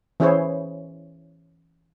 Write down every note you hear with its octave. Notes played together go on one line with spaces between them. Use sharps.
E3 C#4 E4 G#4 C5 C#5